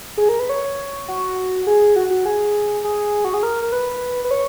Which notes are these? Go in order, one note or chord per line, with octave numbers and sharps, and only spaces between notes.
G#4
A#4
B4
C#5
F#4
G#4
F#4
F#4
G#4
G#4
F#4
G#4
A#4
A#4
B4
B4
C#5